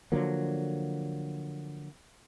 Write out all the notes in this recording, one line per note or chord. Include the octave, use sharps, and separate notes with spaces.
D3 F3 F#3 A#3